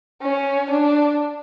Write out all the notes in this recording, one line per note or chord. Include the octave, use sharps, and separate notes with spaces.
C#4
D4